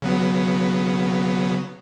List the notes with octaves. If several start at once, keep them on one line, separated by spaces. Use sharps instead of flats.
C#3 F#3 B3